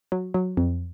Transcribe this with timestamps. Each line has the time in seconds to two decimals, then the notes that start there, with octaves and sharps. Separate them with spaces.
0.12 F#3
0.34 F#3
0.57 F2